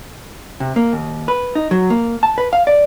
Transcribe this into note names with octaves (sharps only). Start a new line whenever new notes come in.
C3
A#3
D#2
B4
D#4
F#3
A#3
A5
B4
F5
D5